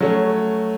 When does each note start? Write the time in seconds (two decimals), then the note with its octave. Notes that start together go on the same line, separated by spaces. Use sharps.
0.01 F#3 A3 C#4